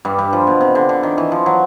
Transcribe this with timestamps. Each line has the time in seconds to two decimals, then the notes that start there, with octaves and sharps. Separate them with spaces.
0.05 G2 G3
0.18 G2 G3
0.33 F3
0.47 B2
0.61 C3
0.75 D3
0.89 D3
1.03 D#3
1.18 E3
1.32 F3
1.46 F#3